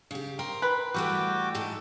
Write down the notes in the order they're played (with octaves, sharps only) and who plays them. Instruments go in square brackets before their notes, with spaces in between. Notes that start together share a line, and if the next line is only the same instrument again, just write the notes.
[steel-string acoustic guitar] C#3 G4
A#4 C5 G5
[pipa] B4
[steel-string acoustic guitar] E3 G3 A3 [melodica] F#4 G5 D6
[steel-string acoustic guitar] G#2 E3 A4